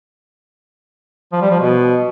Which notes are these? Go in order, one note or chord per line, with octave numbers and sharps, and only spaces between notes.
F3
G3
F3
B2